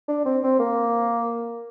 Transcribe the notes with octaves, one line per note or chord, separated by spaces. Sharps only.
D4
C4
C4
A#3